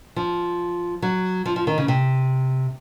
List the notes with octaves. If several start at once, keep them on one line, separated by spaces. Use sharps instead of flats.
F3
F#3
F3
F3
D#3
C#3
C3